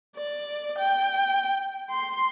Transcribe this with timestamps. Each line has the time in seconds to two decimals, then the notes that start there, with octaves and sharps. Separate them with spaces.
0.17 D5
0.78 G5
1.91 C6